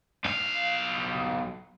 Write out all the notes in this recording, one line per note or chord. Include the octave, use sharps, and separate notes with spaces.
B1 F5